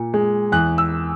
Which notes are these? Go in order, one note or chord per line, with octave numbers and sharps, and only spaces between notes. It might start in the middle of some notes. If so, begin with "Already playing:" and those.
Already playing: A#2
G#3
E2 F#6
E6